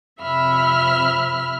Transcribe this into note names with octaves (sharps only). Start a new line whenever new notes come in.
F2 C3 E5 B5 F6